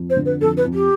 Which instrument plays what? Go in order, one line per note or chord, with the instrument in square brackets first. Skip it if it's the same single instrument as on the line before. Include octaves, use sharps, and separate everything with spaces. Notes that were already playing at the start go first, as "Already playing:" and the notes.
Already playing: [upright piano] F2
[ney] C5
[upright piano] D3
[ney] B4
[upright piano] F2 [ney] A4
[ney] B4
[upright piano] F2
[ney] G4